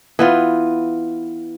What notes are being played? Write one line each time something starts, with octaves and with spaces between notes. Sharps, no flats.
E3 B3 F4